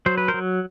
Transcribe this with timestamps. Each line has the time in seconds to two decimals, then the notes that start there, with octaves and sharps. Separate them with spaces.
0.06 F#3 C5
0.18 B4
0.28 A#4 C5
0.34 F#3